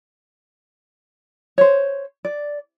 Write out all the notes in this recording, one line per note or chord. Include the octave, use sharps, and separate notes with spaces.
C5 C#5
D5